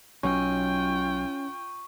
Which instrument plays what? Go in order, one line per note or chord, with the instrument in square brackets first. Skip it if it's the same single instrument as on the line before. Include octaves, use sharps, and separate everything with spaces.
[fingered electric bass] B1 F#3 [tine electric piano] C#4 [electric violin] F4 G5 [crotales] C#6